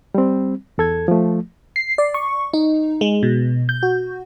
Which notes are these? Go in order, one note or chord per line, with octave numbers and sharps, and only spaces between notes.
G3 C4
E2 A4 G#6
F3 A3
C7
D5
C#6
D#4
G#3
B2
G6
F#4